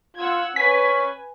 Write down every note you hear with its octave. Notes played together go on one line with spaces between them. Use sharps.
F4 F#5 E6 G#6
C#4 B4 G#5 B6